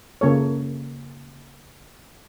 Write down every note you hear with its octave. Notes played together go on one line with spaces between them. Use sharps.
C#3 A#3 A4 C#5